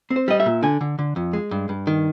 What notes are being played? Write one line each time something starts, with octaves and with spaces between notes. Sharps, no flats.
C4
C5
G3 D#5
E5
A#2
D3 G#5
D3
D3
F2
G#3
G2
G2
D#3